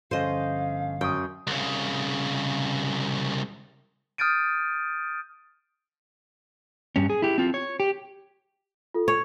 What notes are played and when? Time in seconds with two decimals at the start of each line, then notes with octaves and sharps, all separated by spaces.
0.11 G2 D3 F3 C#4 A4 C5 D#5 F5
1.01 F#2 G5 C#6 D#6
1.47 C2 C#3
4.18 D#6 F6 G6 A6 D7 D#7
6.96 G2 C#4
7.10 G#4
7.22 E4 G4
7.38 C4 F4
7.54 C#5
7.80 G4
8.94 F4 A4
9.08 C#5